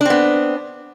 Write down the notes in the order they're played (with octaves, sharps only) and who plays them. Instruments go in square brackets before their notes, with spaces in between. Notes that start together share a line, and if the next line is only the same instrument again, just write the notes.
[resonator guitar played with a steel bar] D4
C4
B3